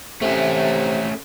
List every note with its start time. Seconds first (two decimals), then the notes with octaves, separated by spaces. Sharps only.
0.22 C3 A3 C#4